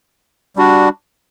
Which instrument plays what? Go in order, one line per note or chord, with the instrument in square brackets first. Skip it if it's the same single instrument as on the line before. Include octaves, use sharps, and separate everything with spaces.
[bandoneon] G3 D4 F#4